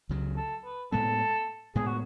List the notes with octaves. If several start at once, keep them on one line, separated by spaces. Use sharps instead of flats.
C#2 C#3 F#3
A4
B4
A2 G#3 B3 A4
A2 G#3 B3 G#4
F#4